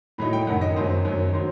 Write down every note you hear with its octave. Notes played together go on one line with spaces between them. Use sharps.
A2 F#3 A3 D#4 B5
G5
F#2 D#3 F#3 F#5
D#5
F#2 D#3 F#3 C5
F#2 D#3 F#3
D#3 F#3 C5